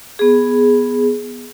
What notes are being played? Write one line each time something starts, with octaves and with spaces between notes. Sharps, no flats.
B3 G#4